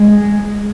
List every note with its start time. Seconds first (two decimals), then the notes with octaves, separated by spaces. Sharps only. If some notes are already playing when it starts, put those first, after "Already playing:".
Already playing: G#3